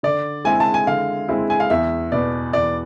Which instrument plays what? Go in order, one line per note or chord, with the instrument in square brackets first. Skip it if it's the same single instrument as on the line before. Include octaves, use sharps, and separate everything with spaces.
[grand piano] D3 [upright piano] D5
[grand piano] G#3 C4 E4 G#4 [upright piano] G#5
[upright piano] A5
G#5
[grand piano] D3 [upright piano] F5
[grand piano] G#3 C4 E4 G#4
[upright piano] G#5
F5
[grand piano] E2 [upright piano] E5
[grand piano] B2 B3 [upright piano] D5
[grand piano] E2 [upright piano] D5